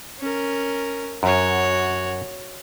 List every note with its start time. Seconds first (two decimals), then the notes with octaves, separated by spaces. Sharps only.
0.19 C#4 A#4
1.23 F#2 F#4 C#5